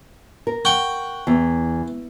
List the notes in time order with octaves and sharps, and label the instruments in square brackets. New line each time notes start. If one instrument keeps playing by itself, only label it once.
[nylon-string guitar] A#4
[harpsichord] F#5 G5 C#6
[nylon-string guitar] E2